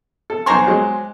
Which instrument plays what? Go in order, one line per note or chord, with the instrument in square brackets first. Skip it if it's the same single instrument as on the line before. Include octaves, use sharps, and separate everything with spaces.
[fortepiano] A4
[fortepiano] B1 A#5 C#6 [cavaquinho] C5 G#5 D6
[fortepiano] F#3 G#3